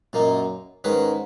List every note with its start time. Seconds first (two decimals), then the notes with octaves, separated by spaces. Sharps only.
0.13 F#2 A#2 A#3 D#4
0.84 G#2 D#3 G#3 C#4 G#4 B4